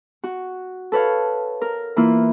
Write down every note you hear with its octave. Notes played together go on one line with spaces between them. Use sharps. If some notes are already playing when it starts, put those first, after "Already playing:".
F#4
A4 B4 C#5 F5
A#4
E3 A#3 E4 F4